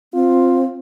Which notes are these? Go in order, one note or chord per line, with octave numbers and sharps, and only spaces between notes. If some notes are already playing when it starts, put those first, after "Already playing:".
C4 F4